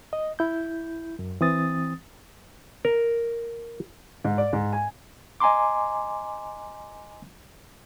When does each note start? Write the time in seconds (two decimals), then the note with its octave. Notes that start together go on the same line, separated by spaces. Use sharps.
0.13 D#5
0.39 E4 G6
1.19 F#2
1.41 E3 C4 D#6 A6
2.85 A#4
4.25 G#2
4.38 D5
4.53 G#2
4.73 G#5
5.40 D#5 G#5 A#5 C6 D6